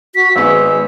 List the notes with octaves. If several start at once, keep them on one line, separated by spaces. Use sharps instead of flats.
F#4 B6
G#1 G#3 B3 E6